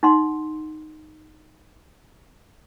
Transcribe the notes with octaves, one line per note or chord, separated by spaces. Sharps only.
D#4 F#5 C6